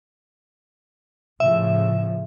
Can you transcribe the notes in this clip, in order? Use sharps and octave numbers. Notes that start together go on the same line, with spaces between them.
A2 C#3 F3 E5